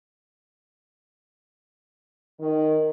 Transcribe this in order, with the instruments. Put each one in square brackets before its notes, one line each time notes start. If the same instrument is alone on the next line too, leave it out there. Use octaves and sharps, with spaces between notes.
[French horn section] D#3